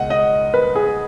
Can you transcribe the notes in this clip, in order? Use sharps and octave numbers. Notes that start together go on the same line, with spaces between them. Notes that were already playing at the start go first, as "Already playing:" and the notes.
Already playing: C#2 B2 D#5 F#5
D#5
B4
G#4